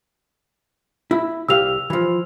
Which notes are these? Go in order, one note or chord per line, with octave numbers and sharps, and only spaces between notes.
E4
C2 G4 F5 E6 F7
E3 F3